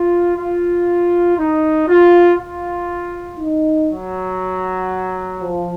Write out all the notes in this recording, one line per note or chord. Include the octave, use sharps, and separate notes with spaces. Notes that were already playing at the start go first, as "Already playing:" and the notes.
Already playing: F4
F4
D#4
F4
F4
D#4
F#3
F3